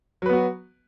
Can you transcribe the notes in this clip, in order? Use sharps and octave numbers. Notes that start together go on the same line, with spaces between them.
F#3 B3 F#4 B4